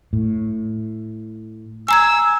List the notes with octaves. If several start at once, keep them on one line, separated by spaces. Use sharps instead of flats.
A2
G#5 A#5 E6 G#6